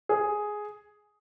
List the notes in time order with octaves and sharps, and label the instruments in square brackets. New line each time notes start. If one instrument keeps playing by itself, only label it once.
[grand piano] G#4